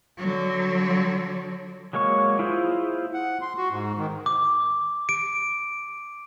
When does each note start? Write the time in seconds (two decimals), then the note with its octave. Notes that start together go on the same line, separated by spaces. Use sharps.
0.18 D3 F#3
1.93 F#3 G#3 A#3 C#5 C#6
2.39 E4 F4 G#4 C5
3.14 F#5
3.41 C6
3.57 F#4
3.71 G#2
3.98 D#3
4.26 D6
5.09 D7